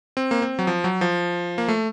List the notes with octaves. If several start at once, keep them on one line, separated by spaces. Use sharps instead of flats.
C4
A#3
C4
F#3
F3
F#3
F3
A#3
A3